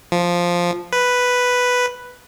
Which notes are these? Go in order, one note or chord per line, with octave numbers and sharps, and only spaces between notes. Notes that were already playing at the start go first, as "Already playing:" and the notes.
F3
B4